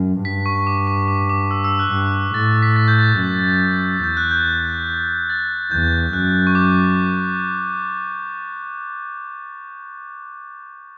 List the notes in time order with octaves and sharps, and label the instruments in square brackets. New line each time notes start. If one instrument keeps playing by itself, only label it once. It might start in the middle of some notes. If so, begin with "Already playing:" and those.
Already playing: [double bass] F#2
[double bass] G2 [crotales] B6
[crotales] C#6
D6
C#6
D6
D6
E6
E6
F#6
[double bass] G2
[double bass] A2 [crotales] A6
[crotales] B6
A6
G6
A6
[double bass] F#2
[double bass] E2 [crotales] G6
[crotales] F#6
G6
A6
[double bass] E2 [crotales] G6
[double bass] F#2 [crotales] F#6
[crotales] C#6
D6